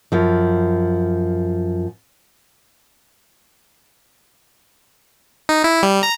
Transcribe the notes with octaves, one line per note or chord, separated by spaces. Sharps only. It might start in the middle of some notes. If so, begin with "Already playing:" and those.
F#2 F3
D#4
E4
G3
A#5